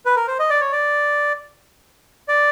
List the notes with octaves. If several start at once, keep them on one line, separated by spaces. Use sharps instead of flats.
B4
A#4
C5
D#5
D5
C#5
D5
D5